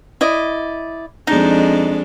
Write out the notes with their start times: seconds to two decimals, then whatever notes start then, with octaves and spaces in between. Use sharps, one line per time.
0.21 E4 D5 D#5
1.27 F2 G#3 D4 D#4